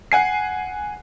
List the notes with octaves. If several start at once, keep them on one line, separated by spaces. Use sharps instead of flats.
F#5 G#5 C7